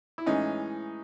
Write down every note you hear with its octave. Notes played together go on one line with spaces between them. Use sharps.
E4
A2 E3 G#3 C#4 D#4